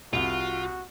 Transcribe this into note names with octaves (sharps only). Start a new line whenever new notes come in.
C2 F4 F#4